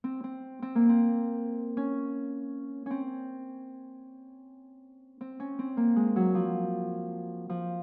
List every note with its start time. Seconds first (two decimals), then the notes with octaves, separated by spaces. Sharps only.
0.04 C4
0.24 C4
0.62 C4
0.75 A#3
0.89 C4
1.77 C#4
2.86 C4 C#4
5.21 C4
5.40 C#4
5.59 C4
5.77 A#3
5.96 G#3
6.16 F#3
6.35 F3
7.50 F3